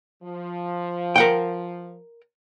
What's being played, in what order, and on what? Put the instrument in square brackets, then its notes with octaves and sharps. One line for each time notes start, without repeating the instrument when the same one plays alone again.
[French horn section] F3
[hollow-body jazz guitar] A#4 F#5 G5